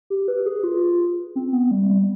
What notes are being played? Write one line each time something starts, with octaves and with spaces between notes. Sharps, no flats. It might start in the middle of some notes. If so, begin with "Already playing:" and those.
G4
B4
G#4
F4
C4
B3
G3
G3